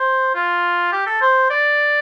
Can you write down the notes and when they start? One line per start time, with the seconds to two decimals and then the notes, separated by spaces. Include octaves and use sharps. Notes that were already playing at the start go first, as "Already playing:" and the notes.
Already playing: C5
0.34 F4
0.92 G4
1.06 A4
1.21 C5
1.50 D5